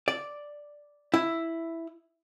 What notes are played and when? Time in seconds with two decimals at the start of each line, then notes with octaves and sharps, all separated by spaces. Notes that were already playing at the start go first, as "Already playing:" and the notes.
0.08 D5
1.14 E4